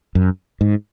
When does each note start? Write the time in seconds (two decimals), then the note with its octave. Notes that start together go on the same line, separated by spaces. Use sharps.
0.15 F#2
0.61 G#2